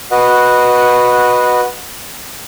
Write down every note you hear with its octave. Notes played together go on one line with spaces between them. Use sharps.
F#4 B4 D#5 F#5